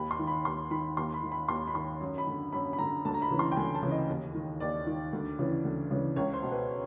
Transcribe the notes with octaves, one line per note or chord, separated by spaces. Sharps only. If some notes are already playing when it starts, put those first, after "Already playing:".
Already playing: D#2 B5
C6
D#3
B5
D#2 C6
D#3 B5
D#2 C6
B5
D#3
B5
D#2 C6
B5
D#3 C6
F#2
B5
D3
F#2 B5
B5
D3 A#5
D2 A5
A#5
B5
C#3 E3
C6
G5
D2 G#5
A5
C#3 E3
D#5
D#2
D#3
D#2 D5
D#3
D2
C#3 E3
D2
C#3 E3
C#2 C#5
C5
B2
B4